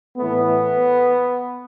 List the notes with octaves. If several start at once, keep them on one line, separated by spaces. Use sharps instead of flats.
A2 E3 A3 B3